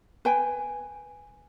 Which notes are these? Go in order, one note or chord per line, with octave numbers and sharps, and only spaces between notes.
B4 G5 G#5